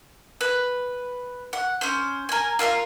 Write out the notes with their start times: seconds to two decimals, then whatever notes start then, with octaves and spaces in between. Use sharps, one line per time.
0.41 B4
1.53 F#5
1.81 C#4 C5
2.29 A#4 G#5
2.59 F4 A#4 E5 F5